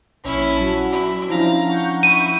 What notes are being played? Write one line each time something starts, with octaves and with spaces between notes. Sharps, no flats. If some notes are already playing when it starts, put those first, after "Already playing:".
A#1 C#4 E4
F#3 F#4 A5
E4
F3 C#4 D4 E4 F5 A#5
F#5 C#6 G6
E4 D#7